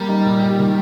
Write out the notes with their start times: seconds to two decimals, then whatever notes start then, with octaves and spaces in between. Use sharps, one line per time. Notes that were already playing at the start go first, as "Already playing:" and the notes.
Already playing: G3 A#3
0.09 D#4
0.25 A#2
0.41 G4
0.59 D#3